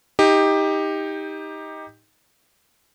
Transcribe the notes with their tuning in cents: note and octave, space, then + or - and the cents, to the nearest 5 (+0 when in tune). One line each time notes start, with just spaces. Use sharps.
D#4 +15 G4 +15